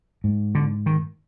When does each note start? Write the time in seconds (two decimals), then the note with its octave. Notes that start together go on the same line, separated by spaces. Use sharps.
0.24 G#2
0.55 D3
0.86 D#3